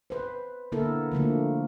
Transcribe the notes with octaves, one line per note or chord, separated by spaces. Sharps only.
B4 C5
D3 A#3 B3 E4 A4 A#4
D3 F3 A3 A#3